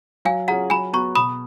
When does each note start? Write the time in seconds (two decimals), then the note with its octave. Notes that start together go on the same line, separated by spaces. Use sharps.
0.25 F#3 F5 G#5
0.48 C#4 F4 G#4 F#5 A#5
0.70 F#3 G#5 B5
0.93 B3 F#4 A#5 C#6
1.15 B2 B5 D#6